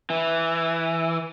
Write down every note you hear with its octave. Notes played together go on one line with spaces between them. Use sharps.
E3